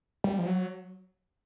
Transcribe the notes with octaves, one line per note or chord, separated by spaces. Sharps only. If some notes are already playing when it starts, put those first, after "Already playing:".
G3
F3
F#3